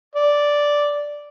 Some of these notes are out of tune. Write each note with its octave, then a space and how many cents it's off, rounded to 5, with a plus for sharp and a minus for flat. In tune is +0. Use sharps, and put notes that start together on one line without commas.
D5 -5